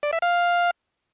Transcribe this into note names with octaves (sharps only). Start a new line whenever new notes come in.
D5
E5
F5